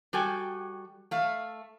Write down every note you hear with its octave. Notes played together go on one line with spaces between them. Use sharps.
G3 F#4 A4 G5 G#5
A3 F5